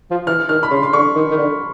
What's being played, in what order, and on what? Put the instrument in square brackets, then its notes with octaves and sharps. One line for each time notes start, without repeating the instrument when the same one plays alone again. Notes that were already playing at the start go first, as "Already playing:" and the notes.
[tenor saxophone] F3
[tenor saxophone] E3 [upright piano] F6
[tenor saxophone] D#3 [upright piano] F6
[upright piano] B5
[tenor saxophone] C#3 [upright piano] C6
[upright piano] C6
[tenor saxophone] D3 [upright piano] C#6
[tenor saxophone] D#3
D#3
D3